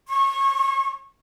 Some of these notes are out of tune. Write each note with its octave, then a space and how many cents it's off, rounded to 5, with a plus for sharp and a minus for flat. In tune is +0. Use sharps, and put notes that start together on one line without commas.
C#6 -30